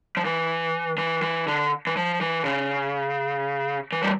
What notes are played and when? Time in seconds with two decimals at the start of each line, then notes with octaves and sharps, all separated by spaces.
0.17 F3
0.25 E3
0.98 E3
1.22 E3
1.48 D3
1.87 E3
1.97 F3
2.21 E3
2.45 C#3
3.92 E3
4.02 G3